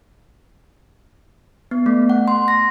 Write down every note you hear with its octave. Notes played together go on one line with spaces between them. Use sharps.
B3
A3
F#5
C6
A#6